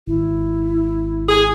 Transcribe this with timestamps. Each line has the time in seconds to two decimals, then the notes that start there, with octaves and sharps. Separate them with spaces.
0.07 G#1 E4
1.29 G#4